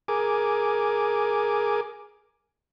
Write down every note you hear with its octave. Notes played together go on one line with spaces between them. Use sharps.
G#4 A#4 G#5 D6